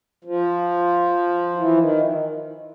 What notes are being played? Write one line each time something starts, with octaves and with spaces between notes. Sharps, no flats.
F3
E3
D#3